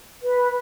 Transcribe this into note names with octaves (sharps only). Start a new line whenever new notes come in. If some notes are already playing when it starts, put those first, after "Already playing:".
B4